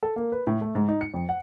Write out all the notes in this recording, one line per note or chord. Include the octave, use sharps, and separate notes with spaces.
A4
A#3
B4
A2
A3
G#2
D#4
C#7
F2
F#5